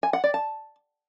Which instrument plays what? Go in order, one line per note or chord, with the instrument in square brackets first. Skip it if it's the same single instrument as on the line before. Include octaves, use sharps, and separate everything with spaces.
[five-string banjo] G#5
F#5
D5
A5